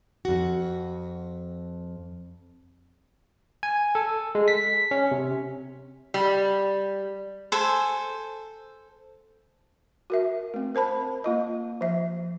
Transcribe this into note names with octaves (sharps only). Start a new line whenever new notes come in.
F2 F#4
G#5
A4
G#3
B6
C#4
C3
G3
A4 C5 G#5
F#4 A#4 E5
A3 C4
A#4 C5 A5 B5
A#3 F4 D#5
F3 E5